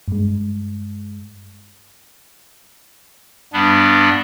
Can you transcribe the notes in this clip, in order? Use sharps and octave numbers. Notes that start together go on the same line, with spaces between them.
G2 G#3
G2 G3 B3 D4